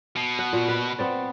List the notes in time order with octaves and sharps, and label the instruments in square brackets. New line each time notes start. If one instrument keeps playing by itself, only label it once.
[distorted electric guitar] B2
[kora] F#5
A#2
B4
B3 C4 D5